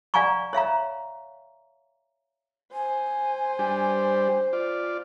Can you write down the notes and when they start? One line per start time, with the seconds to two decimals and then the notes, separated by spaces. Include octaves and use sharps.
0.14 D5 F5 F#5 G#5 A#5 C#6
0.53 C#5 E5 F5 A#5
2.73 C5 G#5
3.59 G3 D4 G4
4.53 F4 D5